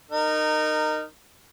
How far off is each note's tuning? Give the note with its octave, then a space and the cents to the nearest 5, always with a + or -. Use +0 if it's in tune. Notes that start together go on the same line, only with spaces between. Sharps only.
D#4 -20 A#4 -10